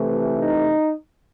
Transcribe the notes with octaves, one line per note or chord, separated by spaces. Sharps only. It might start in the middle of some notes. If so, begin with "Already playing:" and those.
Already playing: C3 E3 A3
D#4